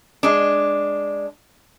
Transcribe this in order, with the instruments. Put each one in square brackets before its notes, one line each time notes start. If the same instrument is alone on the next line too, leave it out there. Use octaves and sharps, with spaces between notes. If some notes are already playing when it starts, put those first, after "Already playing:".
[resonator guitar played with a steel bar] G#3 D4